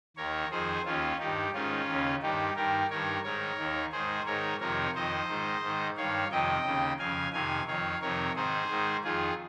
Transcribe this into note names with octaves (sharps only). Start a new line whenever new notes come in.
D#2 D#3 A#4 C#5
F2 D#3 G#4 C5
D#2 D#3 C#4 F4
G2 D#3 D#4 G4
G#2 D#3 C#4 F4
D#2 C#3
G2 D#3 D#4 G4
G2 D#3 G4 A#4
G2 D#3 A#4 C#5
G#2 D#3 A#4 C#5
D#2 D#3
G#2 D#3 G#4 C5
G#2 D#3 A#4 C#5
F2 C3 D#3 A#4 C#5
F2 D#3 C5 D#5
G#2 D#3
G#2 D#3
G2 D#3 C#5 F5
F2 C3 D#3 D#5 G5
D#2 C#3
F2 C#3 F5 G#5
F2 C3 D#3 F5 G#5
F2 D#3 C#5 F5
F2 C3 D#3 A#4 C#5
G#2 D#3 G#4 C5
G#2 D#3
F2 D#3 F4 G#4